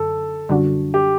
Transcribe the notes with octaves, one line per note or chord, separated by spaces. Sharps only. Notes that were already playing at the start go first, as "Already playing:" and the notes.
Already playing: F#2 D3 A4
F#2 D3 G3 D4 F#4
G4